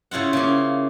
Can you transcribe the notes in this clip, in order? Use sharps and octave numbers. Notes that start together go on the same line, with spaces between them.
C#3 E4 F4 F#5
C#3 A#3